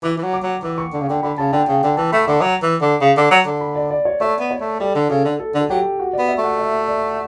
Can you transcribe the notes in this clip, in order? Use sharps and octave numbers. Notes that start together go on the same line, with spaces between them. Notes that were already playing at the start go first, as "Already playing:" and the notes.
E3 D6
E3
F#3
D6
F#3
E3 D6
C#6
D3
C#3
D3 G5
D3 B5
C#3 A5
D3 G5
C#3 G5
D3 G5
E3 A5
A3 B5
D3 C#6
F#3
E3
D3
C#3
D3
F#3
D3
B5
D5
D5
C#5
A3 C#5
B3
C#5
A3
G3 A4
D3
C#3 A4
D3
A4
D3
A4
F#3 G4
F#4
D5
B3
E5
A3 F#5
E5
D5